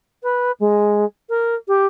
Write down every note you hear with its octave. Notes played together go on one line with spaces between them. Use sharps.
B4
G#3
A#4
G4